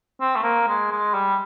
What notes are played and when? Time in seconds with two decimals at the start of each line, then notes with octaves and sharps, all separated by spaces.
0.21 C4
0.36 A3
0.43 A#3
0.68 G#3
0.91 G#3
1.14 G3